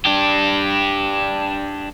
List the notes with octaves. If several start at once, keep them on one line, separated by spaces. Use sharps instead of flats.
D4 G4